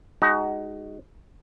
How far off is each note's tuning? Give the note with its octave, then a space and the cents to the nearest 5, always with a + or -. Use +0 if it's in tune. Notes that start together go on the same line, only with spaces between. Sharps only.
G#3 +0 D#4 +0 F#4 +25